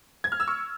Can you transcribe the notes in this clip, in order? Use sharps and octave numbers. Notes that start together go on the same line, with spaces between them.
G#6
F6
E6
C#6